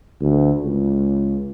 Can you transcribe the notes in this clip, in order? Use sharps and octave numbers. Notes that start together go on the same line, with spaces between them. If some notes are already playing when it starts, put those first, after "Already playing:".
D2
C#2